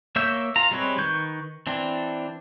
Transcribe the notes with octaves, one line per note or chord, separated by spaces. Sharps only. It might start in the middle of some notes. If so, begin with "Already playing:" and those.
A#3 C#5 E5 E6 G6
F4 A#5
G3 G#3 C4 B4 C#5
D#3 B4 C#6 G6
E3 C4 D4